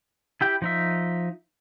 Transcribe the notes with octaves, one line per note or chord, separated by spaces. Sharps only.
E4 G4 G5
F3 D#4 E5